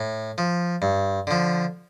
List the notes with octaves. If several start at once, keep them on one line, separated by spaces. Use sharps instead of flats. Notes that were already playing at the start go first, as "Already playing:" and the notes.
Already playing: A2
F3
G2
D3 F3